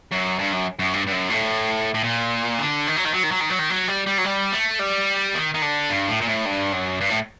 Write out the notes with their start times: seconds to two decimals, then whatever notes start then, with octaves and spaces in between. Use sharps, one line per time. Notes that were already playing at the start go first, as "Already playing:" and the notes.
0.11 F#2
0.38 G2
0.52 F#2
0.79 F#2
0.94 G2
1.07 G2
1.12 F#2
1.30 A2
1.94 A2
2.04 A#2
2.58 D3
2.87 D#3
2.96 F#3
3.05 D#3
3.14 F#3
3.23 D#3
3.31 F#3
3.40 D#3
3.50 F#3
3.59 D#3
3.70 F#3
3.88 G3
4.06 G3
4.18 F#3
4.24 G3
4.52 A3
4.79 G3
5.35 D#3
5.54 D#3
5.62 D3
5.90 G2
6.08 A2
6.21 A#2
6.27 A2
6.46 G2
6.73 F#2
7.01 G2
7.10 A2